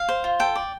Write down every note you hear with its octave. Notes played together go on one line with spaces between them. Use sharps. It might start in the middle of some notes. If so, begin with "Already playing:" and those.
Already playing: F5
C5
F4
A4 G5
D5